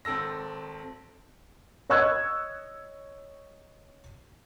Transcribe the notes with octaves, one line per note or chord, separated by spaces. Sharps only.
G#1 C4 A4 E6 A#6
C#5 D#5 C#6 E6 F#6 G#6